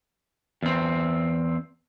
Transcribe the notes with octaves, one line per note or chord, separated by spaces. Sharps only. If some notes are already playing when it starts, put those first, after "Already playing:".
E2 C4